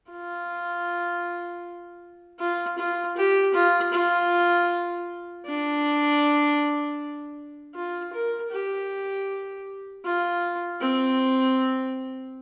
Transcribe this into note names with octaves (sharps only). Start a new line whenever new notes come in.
F4
F4
F4
G4
F4
F4
D4
F4
A#4
G4
F4
C4